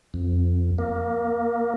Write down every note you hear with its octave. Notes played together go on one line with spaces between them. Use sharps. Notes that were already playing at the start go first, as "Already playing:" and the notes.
F2
A#3